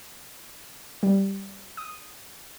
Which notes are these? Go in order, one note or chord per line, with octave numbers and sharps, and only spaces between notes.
G3
D#6